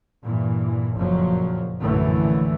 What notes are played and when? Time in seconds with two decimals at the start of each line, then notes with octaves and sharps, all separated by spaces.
0.24 G2 A#2 E3
0.95 F#1 F2 A#2 F3 F#3
1.82 A#1 F#2 A2 D3 E3 A3